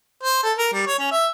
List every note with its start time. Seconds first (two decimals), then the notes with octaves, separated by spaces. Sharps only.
0.23 C5
0.43 A4
0.58 A#4
0.73 G3
0.87 C#5
0.99 C#4
1.12 E5